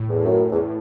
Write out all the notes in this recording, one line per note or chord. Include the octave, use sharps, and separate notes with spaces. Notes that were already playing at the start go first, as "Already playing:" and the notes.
Already playing: A2
E2
F#2
E2
A2